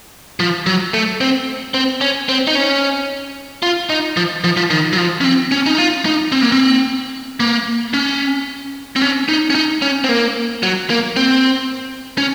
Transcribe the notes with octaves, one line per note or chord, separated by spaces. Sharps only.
F3
F#3
A3
C4
C4
C#4
C4
D#4
C#4
F4
D#4
F3
F3
F3
D#3
F#3
F3
C#4
C4
C#4
D#4
F4
D#4
C4
A#3
C4
A#3
C#4
C4
C#4
D#4
C#4
D#4
C#4
C4
A#3
F#3
A#3
C4
C#4